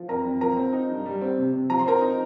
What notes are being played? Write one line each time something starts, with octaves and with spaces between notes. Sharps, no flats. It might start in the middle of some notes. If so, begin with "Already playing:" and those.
Already playing: F3
F2 A#4 A#5
F2
F3 A#4 A#5
C4
D#4
G2
G3
C4
C3
C3
F3 A#5
C6
C4 A#4 A#5
D#4